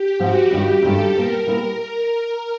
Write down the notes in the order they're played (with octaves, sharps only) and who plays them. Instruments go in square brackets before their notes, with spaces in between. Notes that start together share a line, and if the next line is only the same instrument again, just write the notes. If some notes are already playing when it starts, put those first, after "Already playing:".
Already playing: [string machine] G4
[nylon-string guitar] G#2 F3 A3 C4 [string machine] F#4
[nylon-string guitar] G2 D#3 G#3 C#4 E4 [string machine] G4
[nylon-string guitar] G2 D#3 G#3 C#4 E4 [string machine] A4
[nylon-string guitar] A#2 G3 B3 E4 [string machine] A#4
[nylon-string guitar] A#2 G3 B3 E4